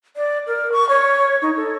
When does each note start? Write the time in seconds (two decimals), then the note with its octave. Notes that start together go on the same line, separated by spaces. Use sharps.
0.16 D5
0.47 A#4
0.72 C#6
0.89 C#5
1.42 D#4
1.57 A4